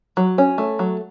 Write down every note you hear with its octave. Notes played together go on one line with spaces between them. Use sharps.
F#3
C#4
A3
F#3